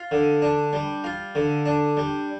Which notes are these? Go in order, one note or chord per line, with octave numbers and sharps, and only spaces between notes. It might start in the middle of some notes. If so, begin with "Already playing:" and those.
Already playing: F4
D3
D4
G3
F4
D3
D4
G3